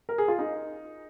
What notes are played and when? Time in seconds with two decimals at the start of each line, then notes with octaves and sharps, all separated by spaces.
0.09 A#4
0.18 G#4
0.28 F4
0.39 D#4